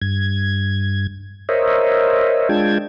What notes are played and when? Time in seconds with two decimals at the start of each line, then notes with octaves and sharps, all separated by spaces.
0.02 G2 G#6
1.49 A#4 C5 C#5 D#5 E5
2.49 G#3 D4 F4 G5 A5 G#6